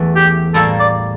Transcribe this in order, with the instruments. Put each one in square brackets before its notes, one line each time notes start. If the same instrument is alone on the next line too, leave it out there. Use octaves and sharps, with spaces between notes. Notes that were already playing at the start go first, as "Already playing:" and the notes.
Already playing: [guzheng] E2 E3 A3
[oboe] G4
[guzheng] A2 G3 A#3 [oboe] A4
[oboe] D5